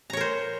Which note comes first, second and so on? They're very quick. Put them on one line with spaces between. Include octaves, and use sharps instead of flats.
A#5 C#5 A#4 C5